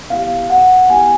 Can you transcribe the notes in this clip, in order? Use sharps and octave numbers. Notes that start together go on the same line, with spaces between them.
B3 E4 G4 F5
F#5
B3 E4 G4 G#5